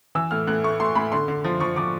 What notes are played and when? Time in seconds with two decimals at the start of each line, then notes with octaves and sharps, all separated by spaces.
0.15 E3 E6
0.31 A2 F6
0.47 A2 F#6
0.64 A3 C#6
0.80 A3 C6
0.95 A2 B5
1.12 D3 C6
1.28 D3
1.44 F3
1.60 F3 C#6
1.76 F3 D6